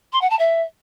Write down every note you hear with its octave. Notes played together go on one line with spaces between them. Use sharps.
C6
F#5
A5
E5